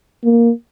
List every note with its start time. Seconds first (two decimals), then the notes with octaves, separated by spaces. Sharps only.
0.24 A#3